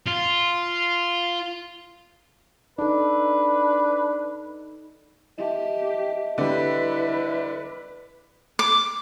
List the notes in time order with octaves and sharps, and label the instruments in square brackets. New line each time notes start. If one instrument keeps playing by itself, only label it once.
[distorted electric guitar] F4
[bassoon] D4 [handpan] D#4 A4 [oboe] B4
[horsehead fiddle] G4 [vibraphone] D#5 E5 A5
[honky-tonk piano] D3 G3 [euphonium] E4 [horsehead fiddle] B4
[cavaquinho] D6